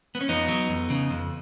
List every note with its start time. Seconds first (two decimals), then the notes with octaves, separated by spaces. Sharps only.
0.15 B3
0.21 C#4
0.29 F2 B3 D#4
0.48 F#3
0.69 F2
0.90 C#3
1.10 F2